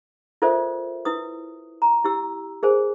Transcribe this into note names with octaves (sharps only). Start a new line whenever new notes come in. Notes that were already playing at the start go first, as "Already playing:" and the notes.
F4 A4 A#4 C5 D5 E5
E4 B4 D#6
A#5
E4 G4 E6
G#4 A#4 C5 G#5